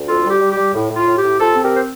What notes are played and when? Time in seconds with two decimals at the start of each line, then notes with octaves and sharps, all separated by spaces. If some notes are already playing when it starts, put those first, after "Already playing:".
Already playing: D2
0.08 F2 F4 A4
0.25 G3
0.30 G4
0.41 G3
0.52 G4
0.57 G3
0.74 A2
0.91 A2
0.96 F4
1.07 A2
1.18 G4
1.23 A2
1.40 C3 F4 A4
1.56 C4
1.61 G4 A#4
1.76 C5